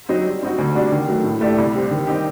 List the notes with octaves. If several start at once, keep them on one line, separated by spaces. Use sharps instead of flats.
F#3 C4 D#4
G3
C4 D#4 F#4
D2
C3 G3 D4 F#4
D#3
F#3 A3
A2
A3 D4 G4 D5
C2
C3 G3 C4
D#3
G3 C4 D#4 G4